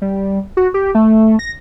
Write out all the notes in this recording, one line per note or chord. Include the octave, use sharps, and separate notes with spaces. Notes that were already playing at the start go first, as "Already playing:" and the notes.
G3
F#4
G4
A3
A#6